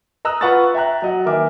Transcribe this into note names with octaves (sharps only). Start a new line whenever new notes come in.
D#5 A#5 D#6 E6 F#6
F4 B4 F#5 C#6 E6 A6
E5 G5 A#5 F#6
F#3 D#5 F#5
D#3 E3 A#3 A#4 E5 D6